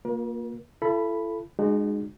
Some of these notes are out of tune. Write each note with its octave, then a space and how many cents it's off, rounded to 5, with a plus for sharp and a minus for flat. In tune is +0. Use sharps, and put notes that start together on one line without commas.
A#3 +0 F4 +30 A#4 +45
E4 +45 A4 +0 B5 +0
G#3 +0 D#4 -40 F#4 +0